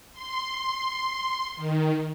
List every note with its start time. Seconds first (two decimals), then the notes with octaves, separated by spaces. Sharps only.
0.13 C6
1.56 D#3